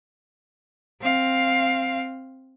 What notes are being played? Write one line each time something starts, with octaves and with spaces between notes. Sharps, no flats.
C4 F5